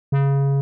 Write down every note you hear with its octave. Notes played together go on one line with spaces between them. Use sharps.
C#3